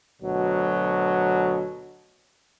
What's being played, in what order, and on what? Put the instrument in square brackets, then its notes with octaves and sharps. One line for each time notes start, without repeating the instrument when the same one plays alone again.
[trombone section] D2 B2 F#3